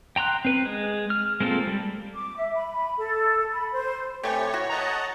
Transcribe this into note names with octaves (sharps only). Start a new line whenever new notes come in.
G5 A#5 C6 F#6
C4 B4
G#3
F6
G#3 A#3 C4 F4 A4
G3
D6
E5
B5
A4
B5
C5
C3 A3 C4 G4 B4 C#5 G#5
E4 F#4
D#5 F#5 A5 A#5